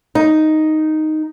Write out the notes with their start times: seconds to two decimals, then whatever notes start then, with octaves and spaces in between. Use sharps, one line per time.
0.15 D#4